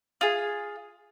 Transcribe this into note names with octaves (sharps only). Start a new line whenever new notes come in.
F4 G#4